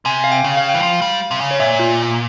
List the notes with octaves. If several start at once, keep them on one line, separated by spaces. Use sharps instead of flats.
C3 G#5
F5
G5
C#3
F5
G5
E3
F3 F5
G3
C3
C#3
C#5
A#2 E5
F4